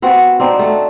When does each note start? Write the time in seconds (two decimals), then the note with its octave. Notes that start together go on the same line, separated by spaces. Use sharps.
0.02 B3 C4 F#4
0.40 C4 D4 D#4
0.59 A3